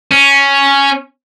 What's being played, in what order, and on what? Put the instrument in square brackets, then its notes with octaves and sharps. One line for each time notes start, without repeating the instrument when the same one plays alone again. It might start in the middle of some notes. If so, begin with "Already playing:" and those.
[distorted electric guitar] C#4